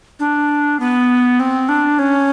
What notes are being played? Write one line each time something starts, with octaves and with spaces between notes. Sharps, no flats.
D4
B3
C4
D4
C#4